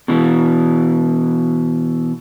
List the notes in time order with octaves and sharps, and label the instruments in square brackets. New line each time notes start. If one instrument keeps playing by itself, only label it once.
[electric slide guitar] B2 E3